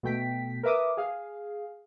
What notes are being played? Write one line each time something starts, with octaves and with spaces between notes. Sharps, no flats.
B2 A3 G5 B6
A#4 B4 E5 D6 D#6
G#4 F5